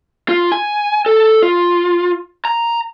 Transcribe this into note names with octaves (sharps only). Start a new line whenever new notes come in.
F4
G#5
A4
F4
A#5